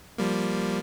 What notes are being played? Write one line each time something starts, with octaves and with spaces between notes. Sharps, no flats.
F3 G3 A#3